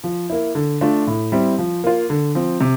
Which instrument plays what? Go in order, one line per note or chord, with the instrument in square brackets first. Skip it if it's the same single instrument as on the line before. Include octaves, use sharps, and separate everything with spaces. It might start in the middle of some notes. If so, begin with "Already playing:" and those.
[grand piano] F3
A#3 E4
D3
A3 D4 F4
A2
G3 C4 E4
F3
A#3 F4
D3
F3 C4
C3